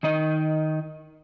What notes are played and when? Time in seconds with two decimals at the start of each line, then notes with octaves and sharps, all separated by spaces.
0.03 D#3 D#4 D#5